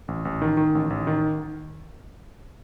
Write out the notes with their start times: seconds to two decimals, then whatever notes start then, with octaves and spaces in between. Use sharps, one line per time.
0.08 A1
0.25 A1
0.42 D#3
0.57 D#3
0.75 A1
0.90 A1
1.07 D#3